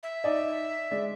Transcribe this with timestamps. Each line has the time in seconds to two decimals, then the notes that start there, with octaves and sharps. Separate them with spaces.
0.03 E5
0.24 D#4 D5 D#5
0.91 G#3 D5